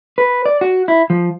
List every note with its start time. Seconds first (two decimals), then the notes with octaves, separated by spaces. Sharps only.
0.18 B4
0.46 D5
0.61 F#4
0.88 E4
1.10 F3